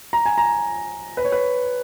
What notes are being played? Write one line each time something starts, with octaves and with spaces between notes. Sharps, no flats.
A#5
G#5
A#5
B4
C#5
B4